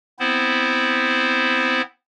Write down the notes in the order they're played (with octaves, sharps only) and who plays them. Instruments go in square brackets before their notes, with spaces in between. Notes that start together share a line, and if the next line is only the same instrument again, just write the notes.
[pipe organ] B3 C4 E4 C5